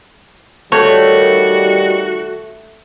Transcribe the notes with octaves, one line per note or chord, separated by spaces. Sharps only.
D#3 G3 A3 F#4 C#5